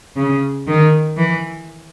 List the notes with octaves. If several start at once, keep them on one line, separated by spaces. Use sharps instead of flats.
C#3
D#3
E3